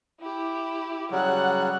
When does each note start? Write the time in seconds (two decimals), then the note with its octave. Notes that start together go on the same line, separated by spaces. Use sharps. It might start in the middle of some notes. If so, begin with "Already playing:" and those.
0.20 E4 G4
1.11 C#3 F#3 G3 F#5 F#6